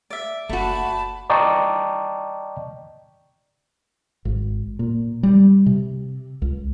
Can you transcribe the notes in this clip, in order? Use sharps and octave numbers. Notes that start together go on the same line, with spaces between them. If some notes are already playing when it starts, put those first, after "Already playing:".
D5 E5
F#1 A3 F#4 A5 B5
D5 D#5 G5 A5 A#5 C#6
G#1
A#2
G3
C3
C#2